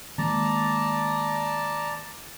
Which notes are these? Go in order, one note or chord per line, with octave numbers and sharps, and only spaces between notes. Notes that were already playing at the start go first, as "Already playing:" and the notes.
D#3 G#3 A#3 D5 A5 A#5